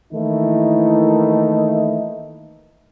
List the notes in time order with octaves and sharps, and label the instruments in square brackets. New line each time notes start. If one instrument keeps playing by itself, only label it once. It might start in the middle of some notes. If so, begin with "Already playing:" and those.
[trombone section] D#3 E3 A3 A#3 D#4 E4